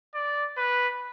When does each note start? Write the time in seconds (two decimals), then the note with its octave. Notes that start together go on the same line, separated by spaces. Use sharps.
0.15 D5
0.58 B4